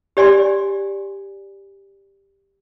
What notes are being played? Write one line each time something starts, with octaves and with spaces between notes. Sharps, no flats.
G4 D5 G#5 C6